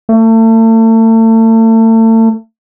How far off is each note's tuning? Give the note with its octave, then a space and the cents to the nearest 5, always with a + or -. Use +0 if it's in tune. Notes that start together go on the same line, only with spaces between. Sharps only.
A3 +35